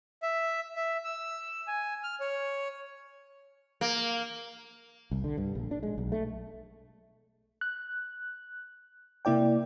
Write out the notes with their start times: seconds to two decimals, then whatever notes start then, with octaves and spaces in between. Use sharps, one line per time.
0.23 E5
0.76 E5
1.04 E6
1.67 G#5
2.03 F6
2.20 C#5
3.81 A#3
5.11 C2
5.24 D3
5.38 G2
5.55 A#1
5.71 D4
5.83 G#3
5.98 B1
6.12 A3
7.61 F#6
9.25 C3 A#3 E4 D5 G5